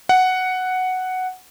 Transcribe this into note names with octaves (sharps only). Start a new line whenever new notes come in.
F#5